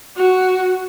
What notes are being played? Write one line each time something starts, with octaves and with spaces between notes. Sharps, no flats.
F#4